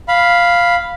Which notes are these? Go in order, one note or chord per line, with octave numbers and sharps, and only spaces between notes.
F5 B5